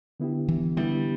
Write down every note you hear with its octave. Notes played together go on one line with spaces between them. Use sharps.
D3 B3 E4 G4
E3
D3 G3 B3 E4 G4